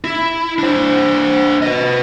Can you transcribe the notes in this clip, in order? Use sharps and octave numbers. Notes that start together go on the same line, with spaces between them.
E4
D4 C5
B4 D#5